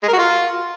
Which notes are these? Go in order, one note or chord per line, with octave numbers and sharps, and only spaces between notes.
G#3
A#4
F#4
F4